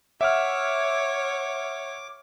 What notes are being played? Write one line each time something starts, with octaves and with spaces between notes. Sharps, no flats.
C#5 E5 F#5 D6 F6